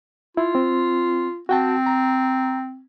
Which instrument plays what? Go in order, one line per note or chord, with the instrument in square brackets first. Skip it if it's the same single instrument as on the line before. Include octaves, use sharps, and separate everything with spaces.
[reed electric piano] E4 [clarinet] F4
[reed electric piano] C4
[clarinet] C4 [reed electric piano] F#4 G5 A5
[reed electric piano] A#5